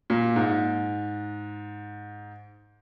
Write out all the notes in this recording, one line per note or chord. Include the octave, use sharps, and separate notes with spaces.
A#2
G#2